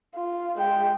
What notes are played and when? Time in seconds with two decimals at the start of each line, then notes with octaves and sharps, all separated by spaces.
0.15 F4
0.58 G#3 G5